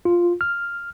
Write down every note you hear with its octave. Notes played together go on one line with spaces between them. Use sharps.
F4
F6